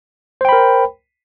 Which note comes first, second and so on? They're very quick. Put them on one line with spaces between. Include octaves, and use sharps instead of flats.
C5 G5 B5 A#4